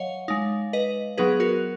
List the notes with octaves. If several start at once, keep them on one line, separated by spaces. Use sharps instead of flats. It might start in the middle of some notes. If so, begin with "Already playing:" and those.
Already playing: F#3 C#5 D#5 F5 F#5
G#3 D#4
B4 D#5
F#3 B3 D#4 G#4 B4
F#4 A#4